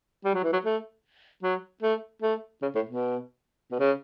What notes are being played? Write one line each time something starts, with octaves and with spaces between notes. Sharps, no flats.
G3
F#3
E3
F#3
A3
F#3
A3
A3
C#3
A2
B2
B2
C#3